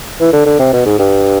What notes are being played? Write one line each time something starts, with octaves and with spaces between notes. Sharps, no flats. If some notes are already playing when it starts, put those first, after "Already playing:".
E3
D3
D3
C3
B2
G#2
G2